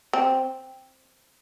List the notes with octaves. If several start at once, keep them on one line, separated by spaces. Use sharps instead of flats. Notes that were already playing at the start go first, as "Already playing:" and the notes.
C4